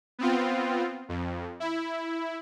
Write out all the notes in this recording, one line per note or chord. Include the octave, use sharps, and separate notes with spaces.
B3 C4 F4
F2
E4